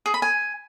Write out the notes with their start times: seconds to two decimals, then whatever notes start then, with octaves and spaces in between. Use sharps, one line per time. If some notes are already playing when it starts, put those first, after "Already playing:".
0.06 G#4
0.14 B5
0.22 G#5